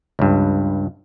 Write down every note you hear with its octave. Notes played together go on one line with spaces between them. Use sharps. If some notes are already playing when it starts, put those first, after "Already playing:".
C#2 G2